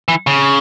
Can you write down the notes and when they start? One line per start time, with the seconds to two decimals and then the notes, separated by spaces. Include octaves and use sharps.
0.08 E3
0.27 C#3